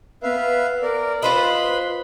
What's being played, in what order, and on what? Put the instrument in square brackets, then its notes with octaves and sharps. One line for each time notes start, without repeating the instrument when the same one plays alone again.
[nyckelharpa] B3 [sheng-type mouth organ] B4 E5 F5
[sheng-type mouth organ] A#4 D5
[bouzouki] F4 C5 D#5 [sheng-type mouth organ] B4 C6 [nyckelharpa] B5